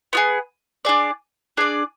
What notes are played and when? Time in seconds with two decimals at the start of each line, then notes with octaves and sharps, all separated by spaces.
0.13 B3 F4 G#4
0.85 D4 G#4 D5
1.57 D4 G#4 D5